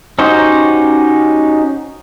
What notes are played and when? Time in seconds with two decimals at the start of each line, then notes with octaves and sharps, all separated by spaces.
0.19 C#4 D#4 F#4 G4 C5